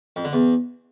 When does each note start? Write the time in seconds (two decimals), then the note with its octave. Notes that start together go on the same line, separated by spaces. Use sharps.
0.16 F2
0.25 D3
0.33 E2